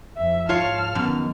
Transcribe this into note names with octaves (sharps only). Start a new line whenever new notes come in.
F2 F3 E5
G#2 F4 C#5 F5 A5 F6
F#2 D#3 B3